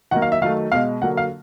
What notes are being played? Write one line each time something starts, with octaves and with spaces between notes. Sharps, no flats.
D#3 F#3 A#3 F#5
F5
E5
D#3 F#3 A3 F5
B2 G#3 F5
D3 F#3 A#3 F#5
F5